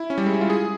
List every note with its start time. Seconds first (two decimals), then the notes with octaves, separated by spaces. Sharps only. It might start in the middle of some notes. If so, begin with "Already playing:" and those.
Already playing: E4
0.10 C#4
0.18 G3
0.26 G#3
0.34 E4
0.41 F4
0.50 G#4